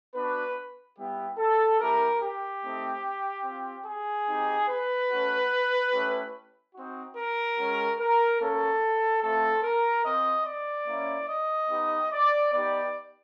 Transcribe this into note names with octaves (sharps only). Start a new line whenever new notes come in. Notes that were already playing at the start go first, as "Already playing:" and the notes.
B3 D4 F#4 B4
G3 B3 E4 G4
A4
G3 C4 E4 G4 A#4
G4
A3 C4 D#4
C4 F4
G#4
C4 D#4 G4
B4
A3 C#4 F#4
A3 C#4 E4 G4
C4 D#4 F#4
A#4
G#3 C#4 F#4
A#4
A#3 C#4 F#4 A4
A3 C4 F4 A4
A#4
C4 F4 D#5
D5
A#3 C#4 E4
D#5
B3 D#4 G4
D5
B3 D#4 G4 D5